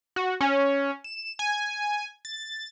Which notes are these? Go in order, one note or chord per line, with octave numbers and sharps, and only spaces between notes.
F#4
C#4
E7
G#5
A6